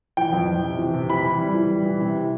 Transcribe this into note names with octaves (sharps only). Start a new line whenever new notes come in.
E3 G5
F2
F2
C3
E3
C3
E3 B5
E3
G3
E3
G3
E3
C3